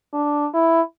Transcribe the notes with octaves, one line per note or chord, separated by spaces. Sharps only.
D4
E4